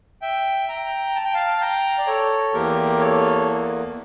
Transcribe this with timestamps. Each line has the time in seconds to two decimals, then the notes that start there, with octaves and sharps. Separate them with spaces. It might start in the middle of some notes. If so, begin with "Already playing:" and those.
0.22 E5 G5
0.69 G5 A#5
1.15 A5
1.25 G5
1.34 F5 A5
1.61 G5 A#5
1.98 D5
2.07 A4 C#5
2.53 E2 E3 A#3 G4 A#4
2.99 A4 C#5